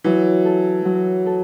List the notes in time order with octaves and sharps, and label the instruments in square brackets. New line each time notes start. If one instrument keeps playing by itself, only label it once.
[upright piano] E3 [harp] F#3
[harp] A4
F#3
A4